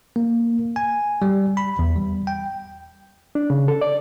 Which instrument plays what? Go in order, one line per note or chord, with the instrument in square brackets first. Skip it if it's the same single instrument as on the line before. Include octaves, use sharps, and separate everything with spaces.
[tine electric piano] A#3
G#5
G3
B5
E2
G3
G5
[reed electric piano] D4
C#3
A4
D5